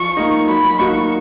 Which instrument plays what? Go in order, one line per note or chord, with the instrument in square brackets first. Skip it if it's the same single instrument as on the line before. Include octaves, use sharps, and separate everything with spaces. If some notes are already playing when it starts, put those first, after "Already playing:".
Already playing: [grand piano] F3 [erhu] C#6
[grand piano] A#3 D#4
[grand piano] F#3 [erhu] B5
[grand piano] A#3 D#4 F#4 [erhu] C#6